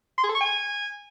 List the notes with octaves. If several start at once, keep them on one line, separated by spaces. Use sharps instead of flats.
C6
G#4
A4
C#6
G#5